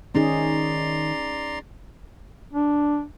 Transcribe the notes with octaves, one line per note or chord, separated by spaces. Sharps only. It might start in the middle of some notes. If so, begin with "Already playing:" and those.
D#3 C#4 D#4 G#4 D5 A#5 C6
D4